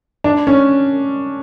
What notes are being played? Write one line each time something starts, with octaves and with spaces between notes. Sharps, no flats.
D4
C#4